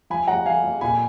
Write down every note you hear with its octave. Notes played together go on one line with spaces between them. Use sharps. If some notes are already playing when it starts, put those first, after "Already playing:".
F3 G#5 B5
F2 F#5 A#5
F3 F5 G#5
F2
A#2 G#5 B5